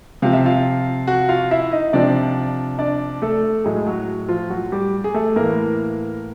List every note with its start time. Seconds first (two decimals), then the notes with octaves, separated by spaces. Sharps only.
0.22 C3 F3 F5
0.33 E5
0.45 F4 F5
1.07 F#4 F#5
1.29 F4 F5
1.51 E4 E5
1.72 D#4 D#5
1.93 C3 F3 D4 D5
2.79 D4 D5
3.22 A3 A4
3.64 A2 F#3 G#3 G#4
3.86 F#3 F#4
4.29 F3 F4
4.50 F#3 F#4
4.72 G3 G4
5.04 G#4
5.14 A3 A4
5.36 A2 E3 A#3 A#4